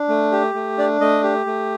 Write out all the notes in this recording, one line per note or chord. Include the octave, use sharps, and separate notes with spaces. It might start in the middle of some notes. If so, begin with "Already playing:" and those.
Already playing: D4
A3
G4
A3
D4 D5
A3 D#5
G4
A3